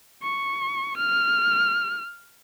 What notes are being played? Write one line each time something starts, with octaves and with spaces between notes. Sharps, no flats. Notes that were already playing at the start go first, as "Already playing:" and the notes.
C#6
F6